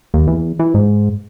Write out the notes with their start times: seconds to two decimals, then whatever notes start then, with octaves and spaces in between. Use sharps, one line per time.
0.14 D#2
0.28 E2
0.59 E3
0.74 G#2